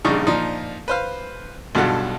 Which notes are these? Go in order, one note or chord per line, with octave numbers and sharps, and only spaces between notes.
A#1 G2 C#3 D#4 D5 C#6
A#2 F3 D4 D#4
B4 C5 F5
B1 G2 B2 F4 A4 F#5